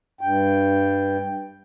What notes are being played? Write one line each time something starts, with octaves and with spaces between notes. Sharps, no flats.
G2 G5